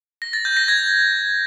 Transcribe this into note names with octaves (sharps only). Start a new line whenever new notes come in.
A#6
A6
G6
A#6
G#6